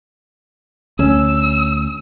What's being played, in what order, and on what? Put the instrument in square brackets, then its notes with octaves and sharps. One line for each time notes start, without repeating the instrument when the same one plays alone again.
[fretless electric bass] D2 [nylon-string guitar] C#4 [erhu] E6